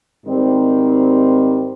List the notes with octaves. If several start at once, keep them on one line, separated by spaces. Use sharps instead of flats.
G#2 D#3 G3 C4 D#4